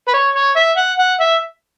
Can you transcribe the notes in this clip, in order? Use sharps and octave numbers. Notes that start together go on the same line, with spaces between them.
B4
C#5
C#5
E5
F#5
F#5
E5